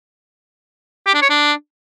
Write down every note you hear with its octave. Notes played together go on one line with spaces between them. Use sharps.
G4
D4
C#5
D4